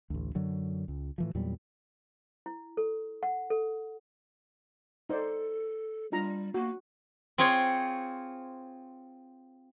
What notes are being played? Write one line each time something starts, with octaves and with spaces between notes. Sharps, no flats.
A1 D2
F#2 D3 F#3
C#2
A2 E3 F3
E2 A#2 F#3 G3
E4
A4
F#5
A4
D#4 A4 C5 D5
G3 D4 F4 A#5
A#3 F#4
C4 F4 G#4 C5 C#5